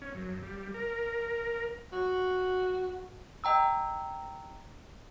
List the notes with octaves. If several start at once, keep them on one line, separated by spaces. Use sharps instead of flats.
C#4
F#2
G3
A#4
F#4
D#5 G5 A#5 E6